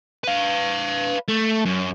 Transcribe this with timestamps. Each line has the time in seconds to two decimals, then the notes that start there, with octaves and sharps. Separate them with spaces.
0.24 B4 F5
1.28 A3
1.65 F#2